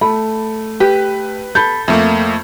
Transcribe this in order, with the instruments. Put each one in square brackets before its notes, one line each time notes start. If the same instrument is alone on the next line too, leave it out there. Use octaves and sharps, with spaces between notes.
[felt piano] A3 [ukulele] B5
[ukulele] G4 [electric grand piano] B4
[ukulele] A4 [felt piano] B5 G6
[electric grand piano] F2 A3 A#3 [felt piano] E5